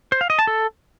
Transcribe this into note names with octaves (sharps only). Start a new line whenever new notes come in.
C5
F5
D#5
A5
A4